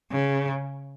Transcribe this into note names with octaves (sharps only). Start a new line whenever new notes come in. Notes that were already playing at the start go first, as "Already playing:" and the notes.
C#3